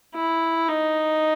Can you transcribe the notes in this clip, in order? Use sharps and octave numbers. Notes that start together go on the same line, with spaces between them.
E4
D#4